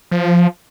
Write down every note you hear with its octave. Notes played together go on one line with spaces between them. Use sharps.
F3